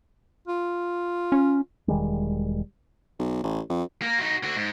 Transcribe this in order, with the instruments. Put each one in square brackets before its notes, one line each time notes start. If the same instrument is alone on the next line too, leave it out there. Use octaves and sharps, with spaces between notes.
[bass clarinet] F4
[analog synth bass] C#4
[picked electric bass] E1 D#3 G3 G#3
[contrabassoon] B1
A1
F2
[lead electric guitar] A#3 A#4
D#4 F#4
D3 F#4
G#2